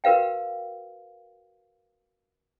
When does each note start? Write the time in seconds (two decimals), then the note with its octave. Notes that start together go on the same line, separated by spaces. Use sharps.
0.04 F#4 A#4 B4 F5 G5